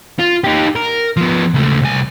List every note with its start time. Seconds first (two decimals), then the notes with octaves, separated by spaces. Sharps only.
0.19 F4
0.44 D#4 G4
0.75 A#4
1.17 F3 B3
1.54 C#2 A3
1.81 C2 G#5